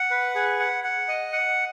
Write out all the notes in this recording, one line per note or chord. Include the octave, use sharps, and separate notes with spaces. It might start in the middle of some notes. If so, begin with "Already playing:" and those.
Already playing: F#5
B4
G#4
F#5
F#5
D#5
F#5